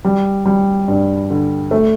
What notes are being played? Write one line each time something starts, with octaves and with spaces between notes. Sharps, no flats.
G3
G3
G2
D3
A3